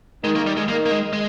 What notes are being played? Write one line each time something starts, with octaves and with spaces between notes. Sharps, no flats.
D#3 G#3
A#3
G3
G#3
D#3 A#3
A#3
G#3
G#3